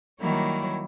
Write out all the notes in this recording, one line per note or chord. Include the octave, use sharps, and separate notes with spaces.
D#3 F#3 G3 A#3 E4 C#5